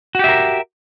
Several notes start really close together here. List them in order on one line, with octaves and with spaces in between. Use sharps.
F#4 G4 E5 A#4